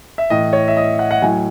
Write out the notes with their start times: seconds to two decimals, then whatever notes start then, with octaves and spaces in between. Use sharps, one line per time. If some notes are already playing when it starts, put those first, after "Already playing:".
0.18 E5
0.30 A2 E3 D#5
0.53 C#5
0.68 E5
0.77 D#5
0.99 F#5
1.11 F#5
1.22 A2 F#3 G#5